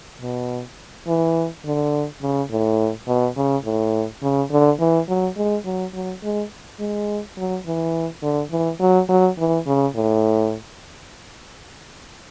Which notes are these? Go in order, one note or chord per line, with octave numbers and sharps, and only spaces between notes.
B2
E3
D3
C#3
A2
B2
C#3
A2
C#3
D3
E3
F#3
G#3
F#3
F#3
G#3
G#3
F#3
E3
D3
E3
F#3
F#3
E3
C#3
A2